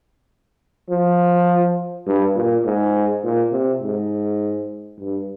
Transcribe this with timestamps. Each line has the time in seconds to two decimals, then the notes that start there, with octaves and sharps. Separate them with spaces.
0.90 F3
2.07 G2
2.36 A#2
2.66 G#2
3.24 A#2
3.53 C3
3.82 G#2
5.00 G2